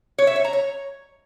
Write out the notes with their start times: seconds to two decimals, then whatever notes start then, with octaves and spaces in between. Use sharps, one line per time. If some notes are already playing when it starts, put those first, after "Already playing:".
0.18 C#5
0.27 E5
0.36 C#5
0.44 A#5
0.53 C#5